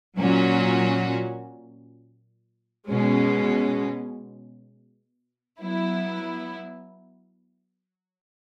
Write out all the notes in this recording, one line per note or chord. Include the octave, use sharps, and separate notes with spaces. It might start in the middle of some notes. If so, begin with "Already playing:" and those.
A#2 F#3 C#4 F#4
B2 G#3 C#4
F#3 B3 E4